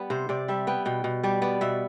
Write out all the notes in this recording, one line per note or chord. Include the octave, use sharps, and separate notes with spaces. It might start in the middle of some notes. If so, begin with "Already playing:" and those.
Already playing: G3 B3 D5
C3 C5
C3 D5
G3 E5
B3 G5
B2 G5
B2
G3 D5
B3 D5
B2 E5